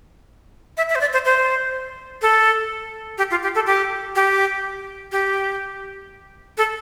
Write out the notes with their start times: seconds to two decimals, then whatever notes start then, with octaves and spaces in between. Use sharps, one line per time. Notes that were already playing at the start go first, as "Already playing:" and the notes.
0.77 E5
0.89 E5
0.95 C5
1.01 D5
1.13 C5
1.25 C5
2.22 A4
3.18 G4
3.31 F4
3.43 G4
3.55 A4
3.67 G4
4.15 G4
5.12 G4
6.57 A4